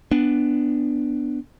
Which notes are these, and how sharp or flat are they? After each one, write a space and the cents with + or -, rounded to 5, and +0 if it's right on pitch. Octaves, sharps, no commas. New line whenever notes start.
B3 +0 D4 +0